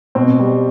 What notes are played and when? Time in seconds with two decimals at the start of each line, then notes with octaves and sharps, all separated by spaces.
0.15 B2 C4
0.39 G3